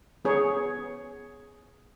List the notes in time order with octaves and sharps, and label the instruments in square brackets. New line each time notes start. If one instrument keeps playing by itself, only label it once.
[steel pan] B3 G#4 C#5